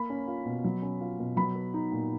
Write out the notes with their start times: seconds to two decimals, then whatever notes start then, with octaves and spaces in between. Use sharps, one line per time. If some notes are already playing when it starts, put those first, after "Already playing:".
Already playing: A#3 B5
0.10 C#4
0.28 F4
0.46 B2
0.64 F#3
0.82 C#4
1.01 F4
1.19 B2
1.37 F#3 B5
1.55 B3
1.74 D#4
1.92 A#2